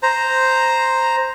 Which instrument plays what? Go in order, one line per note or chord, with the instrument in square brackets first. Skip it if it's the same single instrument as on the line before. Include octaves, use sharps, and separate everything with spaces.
[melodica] C5 A#5